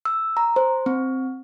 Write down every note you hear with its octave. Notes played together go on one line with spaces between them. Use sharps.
E6
A#5
C5
C4